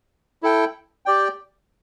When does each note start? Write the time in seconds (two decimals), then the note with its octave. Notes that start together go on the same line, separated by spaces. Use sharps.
0.43 E4 A4 G5
1.06 G4 D5 G5